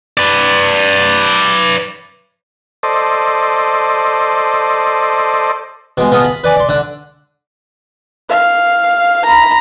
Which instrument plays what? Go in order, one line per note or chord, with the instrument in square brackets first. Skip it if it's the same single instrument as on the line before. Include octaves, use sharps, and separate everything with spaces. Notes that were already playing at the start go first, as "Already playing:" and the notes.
[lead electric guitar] B4 D5
[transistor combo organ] A4 C5 D5 D#5
[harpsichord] B2 G#3
B3 F4 G#4 D#5 A5
B5
B4 D5 G#5 B5
D5 C6
D3 F#5
[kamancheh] F5
A#5 B5